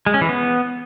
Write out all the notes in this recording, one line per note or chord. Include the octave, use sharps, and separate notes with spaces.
G#3
C#4
E3
B3